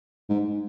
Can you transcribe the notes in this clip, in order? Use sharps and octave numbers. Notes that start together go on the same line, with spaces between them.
G#2